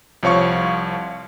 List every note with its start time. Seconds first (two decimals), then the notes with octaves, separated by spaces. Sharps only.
0.23 C2 F3 C#5 F5 C#6